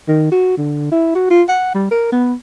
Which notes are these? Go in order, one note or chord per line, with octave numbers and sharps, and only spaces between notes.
D#3
F#4
D3
E4
F#4
F4
F#5
G3
A#4
B3